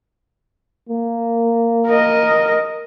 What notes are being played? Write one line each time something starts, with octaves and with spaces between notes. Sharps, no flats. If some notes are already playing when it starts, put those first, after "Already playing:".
A#3
A#4 D#5